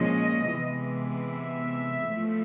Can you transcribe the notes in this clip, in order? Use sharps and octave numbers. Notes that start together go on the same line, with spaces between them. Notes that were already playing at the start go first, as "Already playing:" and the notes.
Already playing: A#2 F3 G#3 C#4 D#5
C3 E3 G#3 B3
E5
A2 F3 A3